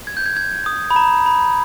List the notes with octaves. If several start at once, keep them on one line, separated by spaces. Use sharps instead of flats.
G#6
G6
G#6
G#6
D#6
B5
A#5
B5